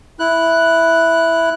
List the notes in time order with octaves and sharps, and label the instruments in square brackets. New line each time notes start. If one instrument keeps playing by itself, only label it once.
[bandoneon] E4 F#6